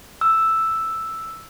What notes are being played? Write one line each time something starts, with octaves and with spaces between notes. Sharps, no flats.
E6